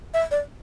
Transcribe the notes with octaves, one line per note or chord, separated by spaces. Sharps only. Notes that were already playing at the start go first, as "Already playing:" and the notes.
E5
D5